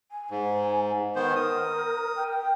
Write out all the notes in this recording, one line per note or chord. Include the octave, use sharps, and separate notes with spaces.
G#5
G#2
D#3 B3 A#4 C5
D#6
G5